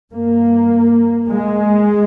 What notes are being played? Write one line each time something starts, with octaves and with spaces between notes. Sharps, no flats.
G2 A#3
G#3